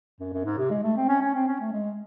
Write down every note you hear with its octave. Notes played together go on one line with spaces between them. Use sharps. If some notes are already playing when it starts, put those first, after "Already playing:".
F#2
F#2
G#2
C3
G#3
A3
C4
C#4
C#4
C4
C#4
A3
G#3